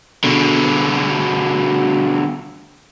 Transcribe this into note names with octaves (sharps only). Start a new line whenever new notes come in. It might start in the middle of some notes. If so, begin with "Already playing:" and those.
B2 D3